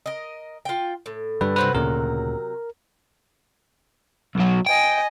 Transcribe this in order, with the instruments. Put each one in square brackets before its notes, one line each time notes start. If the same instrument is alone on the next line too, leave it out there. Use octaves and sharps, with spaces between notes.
[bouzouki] A#4 D#5
F4 G5
A2
[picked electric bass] G2 G3 [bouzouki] D3 [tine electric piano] B4
[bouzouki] C3 F#3 F#4 [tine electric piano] B4 C5
[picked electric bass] D2 A#2 C#3 [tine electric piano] A#4
[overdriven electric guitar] B1 F#3
[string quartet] D#5 G#5 [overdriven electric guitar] G5